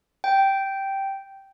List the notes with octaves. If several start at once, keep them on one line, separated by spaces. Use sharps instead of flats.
G5